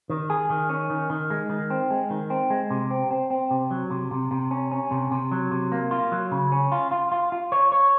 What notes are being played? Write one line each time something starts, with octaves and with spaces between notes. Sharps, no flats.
D#3
G#4
D#3
C#4
D#3
D#3
G#3
D#3
C4
G#3
D#3
C4
G#3
C3
C4
C4
C4
C3
F#3
C3
C3
C3
C#4
C#4
C3
C3
F#3
C3
A#3
F4
F#3
C#3
C#4
F4
F4
F4
F4
C#5
C#5